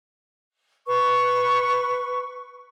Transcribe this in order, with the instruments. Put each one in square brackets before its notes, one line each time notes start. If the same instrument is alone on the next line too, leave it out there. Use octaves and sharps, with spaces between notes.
[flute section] B4 C#6